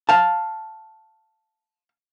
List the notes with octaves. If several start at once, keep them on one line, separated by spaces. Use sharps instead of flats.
F5 A5